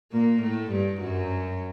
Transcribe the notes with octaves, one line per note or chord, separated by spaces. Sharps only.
A#2 A#3
A2 A3
G2 G3
F#2 F#3